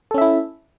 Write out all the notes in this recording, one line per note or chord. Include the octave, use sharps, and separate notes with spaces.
C#4 E4 A4 E5